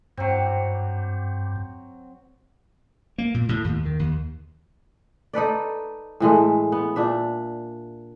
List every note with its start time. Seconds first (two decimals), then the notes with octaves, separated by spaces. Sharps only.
0.18 G2 F#3 C4
3.18 A#3
3.34 A#2
3.49 A2
3.64 D#2
3.85 D#3
3.99 D#2
5.33 D#4 A4 B4 D5
6.20 A2 E3 G#3 A3
6.72 B3
6.96 A#2 D4 E5